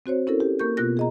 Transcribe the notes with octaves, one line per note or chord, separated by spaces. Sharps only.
C4 F#4 C5 C#5
C#4 E4 A4 A#4
G4
A#3 A#4 C#6 G6
B2 B3 F4 F#6 A#6
G#4 D#5 A#5